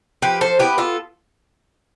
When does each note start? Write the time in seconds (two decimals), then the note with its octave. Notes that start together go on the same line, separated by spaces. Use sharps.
0.22 F3 G4 B4
0.41 A4 C5
0.59 B3 E4 G4 B4
0.78 F4 A4